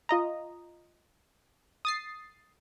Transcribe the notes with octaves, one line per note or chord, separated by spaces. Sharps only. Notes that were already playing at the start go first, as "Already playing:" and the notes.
F4 D#5 A#5
D#6 A6 C7